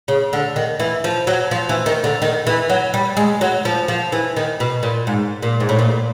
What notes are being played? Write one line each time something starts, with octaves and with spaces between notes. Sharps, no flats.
C#3
D3
D#3
E3
F3
F#3
F3
E3
D#3
D3
D#3
E3
F#3
G3
G#3
F#3
F3
F3
E3
D#3
B2
A#2
G#2
A#2
G#2
A2
A#2